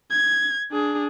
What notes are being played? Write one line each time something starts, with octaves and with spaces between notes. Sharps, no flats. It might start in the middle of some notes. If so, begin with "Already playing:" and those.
G#6
D4 G#4